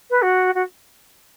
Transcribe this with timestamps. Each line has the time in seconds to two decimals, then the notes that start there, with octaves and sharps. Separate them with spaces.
0.10 B4
0.22 F#4
0.55 F#4